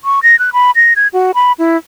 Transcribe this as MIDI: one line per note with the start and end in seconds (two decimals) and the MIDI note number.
0.04 0.20 85
0.23 0.38 94
0.39 0.50 90
0.53 0.71 83
0.76 0.93 94
0.96 1.08 92
1.13 1.32 66
1.35 1.52 83
1.59 1.77 64